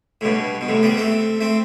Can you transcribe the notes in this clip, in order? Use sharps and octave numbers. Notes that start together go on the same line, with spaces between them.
A2
G2 B2
B2
A2 C3
G3 B3
A3 C4
A3 C4